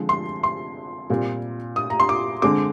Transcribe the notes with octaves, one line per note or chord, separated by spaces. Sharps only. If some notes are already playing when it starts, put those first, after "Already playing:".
Already playing: D3 F3 G#3 C4
C6
C6
A#2 G3 C4
D#6
A#5
C6
D6
D3 G#3 C4 D6